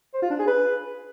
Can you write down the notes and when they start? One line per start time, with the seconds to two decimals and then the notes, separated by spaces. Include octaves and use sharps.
0.14 C5
0.22 F4
0.31 D4
0.39 G#4
0.47 B4